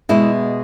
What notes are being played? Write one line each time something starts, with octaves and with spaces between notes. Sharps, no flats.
B2 G#3 B3 E4